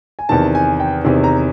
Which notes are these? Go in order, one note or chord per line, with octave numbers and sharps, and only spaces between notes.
G#5
E2 C3 D#3 A5
G#5
G5
E2 C3 D#3
A#5